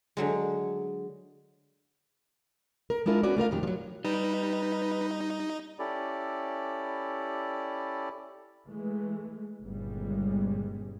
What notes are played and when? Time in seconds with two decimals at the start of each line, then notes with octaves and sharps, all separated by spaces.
0.17 D3 F#3 G#3
2.90 A#4
3.06 G#3 D4 E4 F4 A#4
3.23 B3 C#4 F#4 D5
3.37 A3 F4 A#4 F5
3.51 F2 D#3 G4
3.63 F3 F#3
4.05 G3 D#4 B4
5.79 C#4 E4 G4 A4 D5
8.67 E3 G#3 A3
9.63 G1 A#2 C#3 G3 G#3